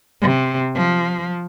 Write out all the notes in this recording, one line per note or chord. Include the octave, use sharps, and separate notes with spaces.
C3
F3